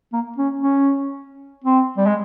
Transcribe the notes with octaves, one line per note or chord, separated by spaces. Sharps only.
A#3
C#4
C#4
C4
G3
G#3